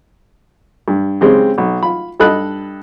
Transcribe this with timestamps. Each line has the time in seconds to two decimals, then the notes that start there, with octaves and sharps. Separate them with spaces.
0.88 G2
1.21 C#3 G#3 C4 G4
1.58 B1
1.82 F4 B5
2.20 G2 A4 D#5 B5 F#6